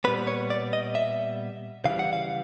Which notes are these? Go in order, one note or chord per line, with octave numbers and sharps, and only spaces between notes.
A#2 G3 B3 B4
C#5
D5
D#5
E5
C#3 E3 G3 F5
F#5
F5